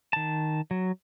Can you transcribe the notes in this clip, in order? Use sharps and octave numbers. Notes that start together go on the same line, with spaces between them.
D#3 A5
F#3